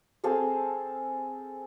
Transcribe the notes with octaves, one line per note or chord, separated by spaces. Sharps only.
C4 G#4 A4 F5